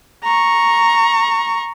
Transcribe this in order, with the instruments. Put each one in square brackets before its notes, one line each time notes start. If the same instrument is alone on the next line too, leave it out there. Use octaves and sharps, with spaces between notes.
[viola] A#5 C#6